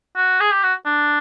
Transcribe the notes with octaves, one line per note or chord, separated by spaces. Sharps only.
F#4
G#4
G4
F#4
D4